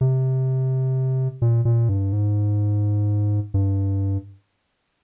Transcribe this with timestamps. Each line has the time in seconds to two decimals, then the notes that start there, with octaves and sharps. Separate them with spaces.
0.01 C3
1.42 A#2
1.65 A#2
1.89 G2
2.13 G#2
3.54 G2